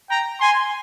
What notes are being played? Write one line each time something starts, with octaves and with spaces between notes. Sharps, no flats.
G5 A#5
G#5 C6